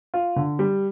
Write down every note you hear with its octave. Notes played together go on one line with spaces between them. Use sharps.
F4
D3
G3